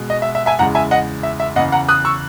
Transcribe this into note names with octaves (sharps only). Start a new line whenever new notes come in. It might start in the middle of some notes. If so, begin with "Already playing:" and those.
Already playing: B2 G#3
D#5
E5
E5
E5 G#5
E2 C#3 G#3 F#5 A#5
E5 G#5
D#5 F#5
E5
E5
E2 C#3 E3 D#5 F#5
F#5 A#5
D#6 F#6
C#6 E6